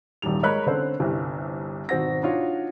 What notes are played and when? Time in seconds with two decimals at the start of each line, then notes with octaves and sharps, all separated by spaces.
0.22 D#1 G#1 D#3 G3 F7
0.43 G#3 A#4 C#5 D#5 B5 F#6
0.66 D3 C4 C#4 A4 C5
1.00 G1 C2 C3
1.89 G#1 B2 C4 F#4 A#6
2.23 D4 D#4 F4 F#4 C#5